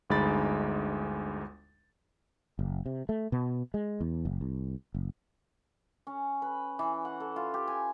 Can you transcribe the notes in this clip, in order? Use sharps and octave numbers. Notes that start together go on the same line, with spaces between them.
G1 D2 G#3 D#4 B5 A6
F#1
C3
A3
B2
G#3
E2
F#1
C2
F#1
C#4
B4
E3
F#5
A4
F4
G4
G#5